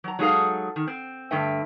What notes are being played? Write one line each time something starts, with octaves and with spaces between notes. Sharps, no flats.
F#3 A#5
F#3 G#3 D#4 G#4 A4 F5
D#3
C4
G2 D3 A3 E5 G5